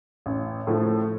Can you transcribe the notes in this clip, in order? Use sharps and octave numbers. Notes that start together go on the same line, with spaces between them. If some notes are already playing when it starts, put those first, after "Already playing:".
A1
A2 F3 A3